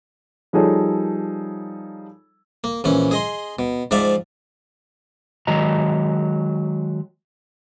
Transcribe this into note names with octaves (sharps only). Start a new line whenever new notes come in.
F3 G3 D#4 G#4 A4 C#5
A#3
A#1 E3 C#4
G#4 D#5 C6
B2
G#2 F3 D5 E5 F5
D#3 F#3 G#3 D#5 A#5